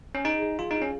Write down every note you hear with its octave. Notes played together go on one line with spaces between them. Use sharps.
C#4
D#4 G#4
G#4
F#3 F4
D#4
F4
C#4